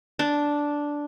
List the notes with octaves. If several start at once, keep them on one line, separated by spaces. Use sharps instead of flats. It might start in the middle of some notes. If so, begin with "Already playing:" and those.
D4